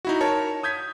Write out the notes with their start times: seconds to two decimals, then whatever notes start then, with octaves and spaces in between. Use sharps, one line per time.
0.05 D#4 E4 F#4
0.21 A#4 C#5 A5
0.63 D#6 G6 G#6 B6